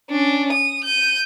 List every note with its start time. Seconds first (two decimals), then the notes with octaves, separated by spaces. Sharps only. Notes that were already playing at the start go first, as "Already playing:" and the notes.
0.10 C#4 D4
0.52 D#6
0.84 G6 D#7